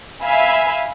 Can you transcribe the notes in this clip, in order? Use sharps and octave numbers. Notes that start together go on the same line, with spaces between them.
E5 F5 G#5 B5